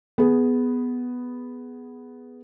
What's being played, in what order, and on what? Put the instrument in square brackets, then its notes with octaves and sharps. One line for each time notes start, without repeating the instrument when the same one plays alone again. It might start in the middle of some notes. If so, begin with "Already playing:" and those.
[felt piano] B3 G#4